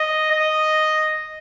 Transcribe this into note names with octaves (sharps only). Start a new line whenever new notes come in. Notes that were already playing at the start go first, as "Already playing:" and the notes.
Already playing: D#5
D#5